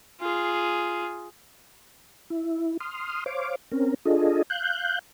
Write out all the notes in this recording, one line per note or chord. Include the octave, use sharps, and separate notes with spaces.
F4 G#4
E4
C6 D#6 F6
C5 C#5 F5 D6
C4 C#4 A#4
D4 F4 G#4 A4 D#5
F5 F#6 G6